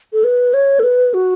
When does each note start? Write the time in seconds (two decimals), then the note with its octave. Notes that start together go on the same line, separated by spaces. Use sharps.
0.13 A4
0.24 B4
0.54 C#5
0.80 A4
0.84 B4
1.14 F#4